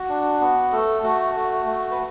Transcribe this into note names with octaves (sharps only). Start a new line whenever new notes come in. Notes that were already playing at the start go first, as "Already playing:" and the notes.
Already playing: F#4
D4
B3
A3 A4
A3 F#4
A3
A3
B4